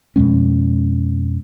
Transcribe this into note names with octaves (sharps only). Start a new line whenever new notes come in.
F2 B2 G#3 C#4